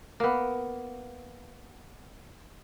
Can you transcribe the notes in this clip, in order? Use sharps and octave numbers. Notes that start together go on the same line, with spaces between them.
A#3 B3